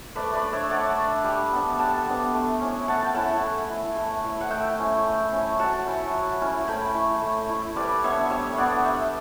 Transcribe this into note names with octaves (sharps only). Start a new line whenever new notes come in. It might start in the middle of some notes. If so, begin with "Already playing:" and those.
A3 B4 D5
B4 D5
D4
C#5 E5
A3 D5 F#5
D4
G3
B3 D4
G3 F#5 A5
B3 D4
A3
C#4 E4
A3 F#5 A5
G5
C#4 E4 F#5 A5
A3
E4
A3
E4
F#5
A3 E5 G5
C#4 E4
A3
C#4 E4
F#3 F#5 A5
C#4 E4
F#3
C#4 E4
A3 G5 B5
E4
A3
E4
G3 B4 D5
B3 D4 C#5 E5
G3 C#5 E5
B3 D4 D5 F#5
G3 E5 G5